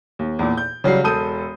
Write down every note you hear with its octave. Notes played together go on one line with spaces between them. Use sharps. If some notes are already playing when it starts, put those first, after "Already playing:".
D#2
E2 A#2
G6
C#3 F#3 G3 C7
E1 A4 D#6 G6 D#7